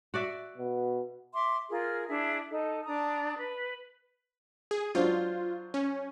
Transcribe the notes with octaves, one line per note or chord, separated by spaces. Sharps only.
F#4 D5 E5
B2
E5 C6 D6
F4 G#4 A#4
D4 E4 G#4 E5
D#4 A4
D4 A#5 D#6
B4
G#4
F#3 D4 F4 C5
C#4